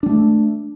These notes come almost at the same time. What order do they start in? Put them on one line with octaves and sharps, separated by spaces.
D4 G3 A3